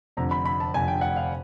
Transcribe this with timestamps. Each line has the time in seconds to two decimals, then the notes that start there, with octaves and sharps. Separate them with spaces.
0.17 F1 F2 D3 A#5
0.31 B5
0.45 B5
0.60 A5
0.74 F1 F2 D3 G#5
0.88 G5
1.01 F#5
1.16 F5